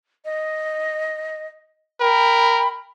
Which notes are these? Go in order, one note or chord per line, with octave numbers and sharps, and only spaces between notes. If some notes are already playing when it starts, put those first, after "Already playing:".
D#5
A#4 G5 B5